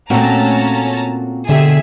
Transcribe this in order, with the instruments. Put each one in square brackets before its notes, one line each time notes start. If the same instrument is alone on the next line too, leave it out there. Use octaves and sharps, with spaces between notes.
[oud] A#2 A3 [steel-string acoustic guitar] A#3 C4 F#4 [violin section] C#4 A5 A#5
[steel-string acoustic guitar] B2 G4 [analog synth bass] D3 [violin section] G#4 E5